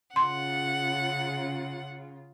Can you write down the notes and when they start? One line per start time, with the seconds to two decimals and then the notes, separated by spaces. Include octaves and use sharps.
0.16 C#3 F4 F#5 C6